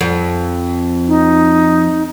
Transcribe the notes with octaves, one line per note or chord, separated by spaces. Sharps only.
F2
D#4